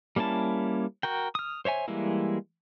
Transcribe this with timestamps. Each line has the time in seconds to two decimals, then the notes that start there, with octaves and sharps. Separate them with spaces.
0.16 G3 A#3 C#4 E4 A5
1.03 F#4 A#4 G5
1.35 D#6 F6
1.65 C5 C#5 E5 G#5
1.88 E3 G3 G#3 A#3 E4